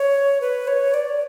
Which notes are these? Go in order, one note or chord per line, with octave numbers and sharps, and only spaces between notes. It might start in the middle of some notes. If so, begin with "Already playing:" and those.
Already playing: C#5
B4
C#5
D5